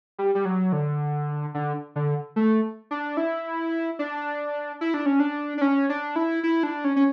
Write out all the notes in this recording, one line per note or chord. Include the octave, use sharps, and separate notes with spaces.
G3
G3
F#3
D3
D3
D3
A3
D4
E4
D4
E4
D4
C#4
D4
D4
C#4
D4
E4
E4
D4
C#4
C#4